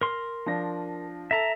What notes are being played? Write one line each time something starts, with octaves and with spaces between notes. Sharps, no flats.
A#4 C6
F3 D4 A#6
A4 E5 A5 A#5